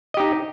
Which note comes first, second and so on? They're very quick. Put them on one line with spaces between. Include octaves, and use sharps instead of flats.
D#5 G4 D#4